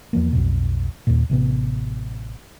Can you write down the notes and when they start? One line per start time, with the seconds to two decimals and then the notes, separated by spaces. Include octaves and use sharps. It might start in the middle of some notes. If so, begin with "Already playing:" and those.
0.13 E2 F3 A#3
0.33 B1 F2 B2
1.07 D#2 A#2
1.30 A1 C3 B3